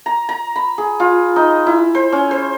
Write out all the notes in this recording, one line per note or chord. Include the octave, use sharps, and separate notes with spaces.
A#5
A#5
B5
G#4
F4
D#4
E4
C5
C#4
C5